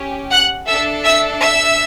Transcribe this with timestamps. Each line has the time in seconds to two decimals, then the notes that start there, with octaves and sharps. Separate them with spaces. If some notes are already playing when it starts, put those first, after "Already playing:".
Already playing: C#4 G4
0.31 F#5 F#6
0.68 D4 A4 E5 E6
1.04 E5 E6
1.40 E5 E6